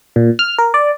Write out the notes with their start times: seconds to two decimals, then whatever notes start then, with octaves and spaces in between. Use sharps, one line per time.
0.16 A#2
0.39 F6
0.58 A#4
0.74 D5